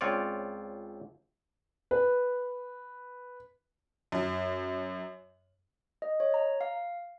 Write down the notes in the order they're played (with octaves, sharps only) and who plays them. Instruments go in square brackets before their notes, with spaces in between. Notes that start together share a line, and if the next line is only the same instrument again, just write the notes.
[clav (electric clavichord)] C#2 C4 F4 C#5 D5
[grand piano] B4
[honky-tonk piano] F#2
[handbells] D#5
C#5
A#5
F5